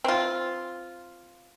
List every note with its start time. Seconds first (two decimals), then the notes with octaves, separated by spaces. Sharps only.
0.04 C4 F4